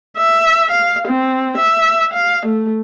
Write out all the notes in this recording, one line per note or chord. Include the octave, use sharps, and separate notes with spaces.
E5
F5
C4
E5
F5
A3